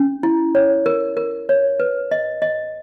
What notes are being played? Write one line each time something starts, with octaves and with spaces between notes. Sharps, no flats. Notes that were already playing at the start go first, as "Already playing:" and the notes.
Already playing: C#4
E4
C#5
A#4
A#4
C#5
B4
D#5
D#5